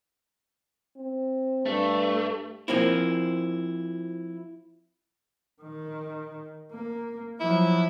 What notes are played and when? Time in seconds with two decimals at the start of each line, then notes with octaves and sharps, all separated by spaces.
0.97 C4
1.66 G2 A3
2.68 F3 A#3 C4 E4
5.62 D#3
6.72 A#3
7.40 F3 F#3 E4